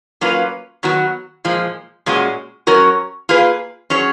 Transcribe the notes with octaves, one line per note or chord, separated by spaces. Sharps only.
F#3 A#3 C#4 F4 B4
D#3 F#3 B3 F#4
A#2 F3 G#3
A#2 G#3 C#4 F#4
F#3 C#4 F#4 A#4 C#5
A#3 F4 G#4 B4
F#3 C#4 G#4 C#5